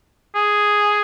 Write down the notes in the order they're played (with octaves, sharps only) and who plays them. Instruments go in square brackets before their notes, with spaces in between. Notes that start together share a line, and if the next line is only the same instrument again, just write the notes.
[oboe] G#4